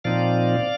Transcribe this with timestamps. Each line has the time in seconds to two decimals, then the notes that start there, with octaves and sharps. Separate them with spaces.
0.04 A#2 F3 C4 D#4 D5 F5